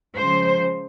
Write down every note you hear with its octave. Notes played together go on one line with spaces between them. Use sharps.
C#3 F3 G#3 C5